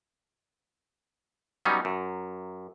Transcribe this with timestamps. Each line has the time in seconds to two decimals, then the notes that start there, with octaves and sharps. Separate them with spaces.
1.65 F#3 G3 B3 C#4 D#4
1.85 F#2